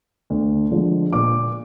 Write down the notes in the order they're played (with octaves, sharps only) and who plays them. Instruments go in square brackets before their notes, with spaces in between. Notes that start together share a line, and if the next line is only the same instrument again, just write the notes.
[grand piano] D2
D3 F3 G#3
A#2 D6